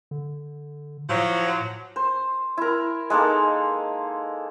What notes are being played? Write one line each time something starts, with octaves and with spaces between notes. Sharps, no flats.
D3
A2 F3 F#3
C5
E4 A#4
G#3 A#3 D#4 A4